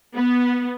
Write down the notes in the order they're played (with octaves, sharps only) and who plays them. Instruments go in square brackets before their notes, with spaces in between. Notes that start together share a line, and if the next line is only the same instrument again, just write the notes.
[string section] B3